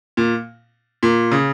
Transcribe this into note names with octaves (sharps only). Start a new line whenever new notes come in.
A#2
A#2
C#3